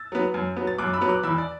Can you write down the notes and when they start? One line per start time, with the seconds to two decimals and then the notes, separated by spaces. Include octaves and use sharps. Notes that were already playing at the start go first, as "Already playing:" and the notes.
Already playing: E6 A6
0.12 F#3 B3
0.34 F#2
0.56 F#3 B3
0.67 A6
0.78 F#2 D6 F#6
0.93 B5 E6
1.01 F#3 B3
1.09 D6 F#6
1.23 E2 B5 E6
1.38 D5